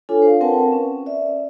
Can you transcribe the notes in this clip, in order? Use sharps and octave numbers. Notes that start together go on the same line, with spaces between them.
D4 F4 A4 C#5 G#5
C5 F5
C4 A#4 B4 F#5 G5 A5
C#4
D5 E5